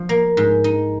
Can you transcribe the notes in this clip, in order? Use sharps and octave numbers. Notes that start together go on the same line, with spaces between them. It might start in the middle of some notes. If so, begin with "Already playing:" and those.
Already playing: F3
A#3
G#2
D#4